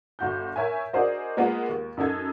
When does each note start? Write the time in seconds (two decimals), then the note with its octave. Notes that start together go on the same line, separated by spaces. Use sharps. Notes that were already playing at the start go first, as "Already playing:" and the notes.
0.19 G1 F#4 G6
0.56 A#4 C#5 E5 G#5
0.93 D4 F#4 G#4 A#4 C5 D#5
1.37 G#3 A#3 B3 F4 A#4
1.69 D#2
1.97 F#2 D#4 A4 G#6